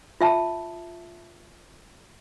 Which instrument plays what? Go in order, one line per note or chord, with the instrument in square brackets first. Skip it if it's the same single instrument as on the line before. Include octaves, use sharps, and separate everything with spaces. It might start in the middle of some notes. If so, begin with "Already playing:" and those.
[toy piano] F4 E5 A5